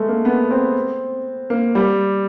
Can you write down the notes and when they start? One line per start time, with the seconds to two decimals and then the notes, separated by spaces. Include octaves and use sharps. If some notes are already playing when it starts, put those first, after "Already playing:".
Already playing: G#3 A3
0.09 A#3
0.25 B3
0.51 C4
1.50 A#3
1.75 G3